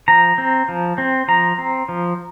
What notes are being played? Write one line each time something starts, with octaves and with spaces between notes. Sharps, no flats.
F3 A#5
C4
F3
C4
F3 A#5
C4
F3